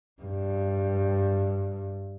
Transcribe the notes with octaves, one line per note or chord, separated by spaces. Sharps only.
G2